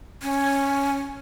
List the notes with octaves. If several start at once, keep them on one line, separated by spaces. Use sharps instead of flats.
C#4